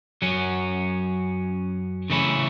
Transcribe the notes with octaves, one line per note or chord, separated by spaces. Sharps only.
F#2 F#3 C#4
C#3 E3 A3 C#4 E4